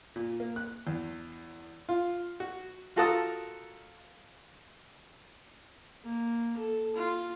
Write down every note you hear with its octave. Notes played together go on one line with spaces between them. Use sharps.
A#2
A#3
F#6
E2
F4
F#4
F4 F#4 A4 A#4 A5 D#6
A#3
A4
F4